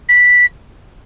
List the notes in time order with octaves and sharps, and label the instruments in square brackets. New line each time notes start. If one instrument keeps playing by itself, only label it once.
[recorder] B6